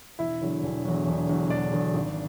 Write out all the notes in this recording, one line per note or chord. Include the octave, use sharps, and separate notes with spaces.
E1 E4 E5
E2 D3 F#3
E1
E2 D3 F#3
E1
E2 D3 F#3
E1 D4 D5
E2 D3 F#3
G#1